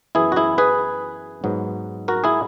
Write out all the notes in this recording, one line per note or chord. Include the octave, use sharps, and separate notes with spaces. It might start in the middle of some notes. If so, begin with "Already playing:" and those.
F#2 E3 B3 E4 G#4
F#4
E4 G#4
G#4 B4
G#2 F#3 B3
F#4 A#4
E4 G#4